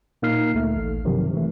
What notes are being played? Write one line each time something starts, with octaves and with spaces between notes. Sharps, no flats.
A#2 A#3 D#4 F6 C7
D2 A3
A1
G2 C3 D#3 F3 F#3
E3 A3